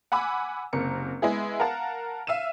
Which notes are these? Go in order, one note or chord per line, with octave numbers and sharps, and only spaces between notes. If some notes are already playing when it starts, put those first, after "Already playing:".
F#5 G#5 B5 D6 E6
F#1 C3 A#4 C#7
G#3 B3 E4 G#4
A#4 F5 F#5 A5
E5 F5 E6 D#7 E7